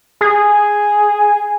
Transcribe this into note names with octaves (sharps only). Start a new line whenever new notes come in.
G#4